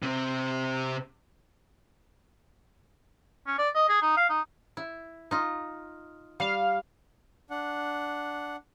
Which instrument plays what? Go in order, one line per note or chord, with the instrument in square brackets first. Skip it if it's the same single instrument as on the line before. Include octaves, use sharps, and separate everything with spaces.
[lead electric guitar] C3 C4
[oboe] C#4
D5
D#5
G#4
D#4
F5
D#4
[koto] E4
D#4 F4
[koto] G3 [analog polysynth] F5
[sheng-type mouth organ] D4 F#5